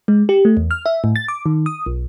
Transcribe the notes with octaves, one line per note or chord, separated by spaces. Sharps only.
G#3
G4
A3
E2
F6
E5
A2
A6
D6
D#3
D#6
B1